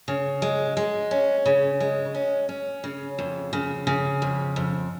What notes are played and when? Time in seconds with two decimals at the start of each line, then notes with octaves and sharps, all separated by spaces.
0.08 C#3
0.42 G#3
0.77 G#3
1.11 C#4
1.46 C#3
1.80 G#3
2.14 C#4
2.49 C#4
2.84 C#3
3.19 F2
3.53 C#3
3.87 C#3
4.22 F2
4.56 F2